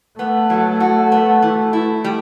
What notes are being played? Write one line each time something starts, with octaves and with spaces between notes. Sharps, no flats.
A3 B3
F#3
F#4
B3
E3
E4
G3